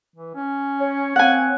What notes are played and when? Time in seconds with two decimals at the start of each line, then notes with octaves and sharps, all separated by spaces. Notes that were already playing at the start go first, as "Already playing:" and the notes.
0.16 E3
0.35 C#4
0.80 C#5
1.16 C4 F#5 G#5